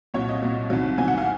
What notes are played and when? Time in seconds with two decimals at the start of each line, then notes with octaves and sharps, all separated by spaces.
0.14 C2 A#2 F#3 C#5
0.28 D#5
0.42 C2 A#2 F#3
0.70 C2 C3 D#3 F#3
0.98 C2 C3 D#3 F#3 G#5
1.08 F#5
1.18 F5